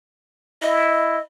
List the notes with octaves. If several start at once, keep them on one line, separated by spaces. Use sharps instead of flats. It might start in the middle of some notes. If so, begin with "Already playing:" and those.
E4 D#5